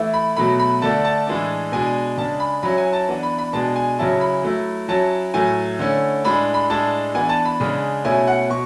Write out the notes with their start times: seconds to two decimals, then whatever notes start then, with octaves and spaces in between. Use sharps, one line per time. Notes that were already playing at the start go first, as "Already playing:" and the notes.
Already playing: E3 A3 E4
0.14 B5
0.36 B2 F#3 A3 B5
0.60 B5
0.82 D3 A3 D4 A5
1.05 A5
1.27 A2 E3 G#3 D4
1.72 B2 G#3 D4 G#5
2.17 C#3 G#3 D4 A5
2.40 B5
2.63 F#3 C#4 E4 B5
2.78 G#5
2.93 A5
3.08 E3 B3 D4
3.23 B5
3.38 B5
3.53 B2 G#3 D4 A5
3.76 G#5
3.99 C#3 F#3 C#4 E4 A5
4.21 B5
4.43 F#3 A3 E4
4.89 F#3 C#4 E4 A5
5.34 A2 F#3 A3 G#5
5.79 D3 A3 C#4 E4
6.24 A2 G#3 D4 B5
6.54 B5
6.70 A2 G#3 D4 A5
7.14 E3 B3 D4 G#5
7.29 A5
7.45 B5
7.60 C#3 G#3 D4
8.04 B2 A3 C#4 E4 G#5
8.27 F#5
8.50 B2 C#6